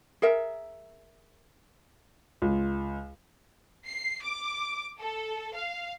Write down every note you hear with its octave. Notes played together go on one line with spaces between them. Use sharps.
G#4 A#4 E5
C#2
C7
D6
A4
F5